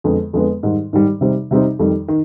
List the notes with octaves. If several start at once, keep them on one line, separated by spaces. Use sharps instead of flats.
F2 D3 G#3 B3
F2 D3 G#3 B3
G#2 D#3 G3
G#2 D#3 G3
C3 G3 C4 D#4
C3 G3 C4 D#4
F2 D#3 G3
D#3